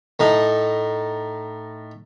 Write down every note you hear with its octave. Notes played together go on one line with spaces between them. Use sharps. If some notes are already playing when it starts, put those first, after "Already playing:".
A2 D#4